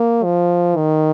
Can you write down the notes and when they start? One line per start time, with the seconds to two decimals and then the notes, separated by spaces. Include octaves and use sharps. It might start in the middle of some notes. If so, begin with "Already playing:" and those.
Already playing: A#3
0.24 F3
0.77 D#3